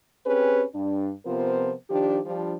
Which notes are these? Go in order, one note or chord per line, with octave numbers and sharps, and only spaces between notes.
C4 C#4 G4 G#4 B4
G2 D4
C3 F3 B3 F4 A#4 C5
D#3 F3 D4 G4
F3 G3 D4